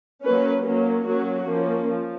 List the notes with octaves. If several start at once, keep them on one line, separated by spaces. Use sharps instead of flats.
F#3 A#3 C#4 B4
F#3 A#3 C#4
F#3 A#3 C#4 F#4
F3 A#3 C#4
F3